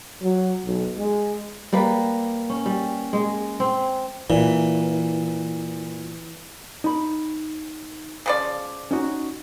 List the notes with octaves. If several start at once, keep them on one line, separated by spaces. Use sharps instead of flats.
F#3
B1
G#3
G3 A#3 B4
C#4
G3
G#3
C4
A#2 E3
D#4 B5
C#3 F3 D5
C#4 D#4 F#4